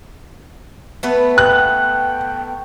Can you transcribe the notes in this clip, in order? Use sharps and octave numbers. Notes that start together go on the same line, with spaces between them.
A3 B3 B4
G5 F#6